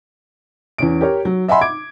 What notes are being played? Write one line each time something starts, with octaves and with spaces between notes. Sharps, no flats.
E2 C#4 D7
G4 A#4 C#5
F#3
D#5 E5 F#5 G#5 B5 C6
D6 G#6 D7